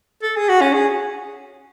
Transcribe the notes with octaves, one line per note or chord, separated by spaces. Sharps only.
A4
G#4
F#4
C#4
G#4